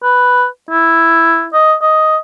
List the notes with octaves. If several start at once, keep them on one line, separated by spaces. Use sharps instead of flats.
B4
E4
D#5
D#5